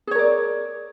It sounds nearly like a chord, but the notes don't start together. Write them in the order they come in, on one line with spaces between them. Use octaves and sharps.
G#4 C#5 A#4 D5